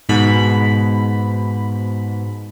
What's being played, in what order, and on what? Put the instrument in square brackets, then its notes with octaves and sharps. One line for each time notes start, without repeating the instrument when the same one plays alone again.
[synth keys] G#2 B2 B5